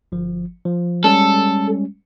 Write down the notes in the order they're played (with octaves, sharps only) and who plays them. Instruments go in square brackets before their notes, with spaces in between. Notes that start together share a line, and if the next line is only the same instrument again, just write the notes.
[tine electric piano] G1 F3
F3
[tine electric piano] G3 G#3 C#4 [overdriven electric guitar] A4